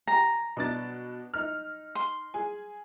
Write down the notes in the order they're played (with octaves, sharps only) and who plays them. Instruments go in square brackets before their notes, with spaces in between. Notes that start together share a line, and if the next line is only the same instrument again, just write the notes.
[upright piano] G4 G#5 [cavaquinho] A#5
[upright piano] B2 D4 A6
D#4 F6
[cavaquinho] C6
[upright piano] G#4 G#5